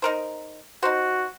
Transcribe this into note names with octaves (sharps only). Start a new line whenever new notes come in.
D#4 A#4 C5
D#4 F#4 C5